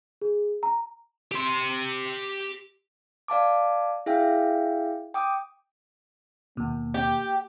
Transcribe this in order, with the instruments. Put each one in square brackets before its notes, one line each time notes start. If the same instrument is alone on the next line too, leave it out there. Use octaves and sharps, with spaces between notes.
[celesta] G#4
A#5
[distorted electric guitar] G4 C6
[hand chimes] D5 F5 A5 D6
E4 G#4 E5 F5 G5
G5 D6 D#6
[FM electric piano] D#2 B2 [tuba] A#3
[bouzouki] G4